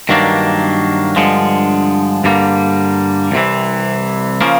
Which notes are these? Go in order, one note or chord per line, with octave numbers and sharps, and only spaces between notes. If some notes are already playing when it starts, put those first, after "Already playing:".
G2 D#3 F#3 A#3 D4
G2 D3 F3 G#3
G2 D3 G3 A#3
C2 C3 E3
C#3 F3 A#3